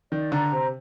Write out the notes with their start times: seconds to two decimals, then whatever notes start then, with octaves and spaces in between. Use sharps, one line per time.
0.12 D#3 D5
0.32 D3 A#5
0.52 C3 C5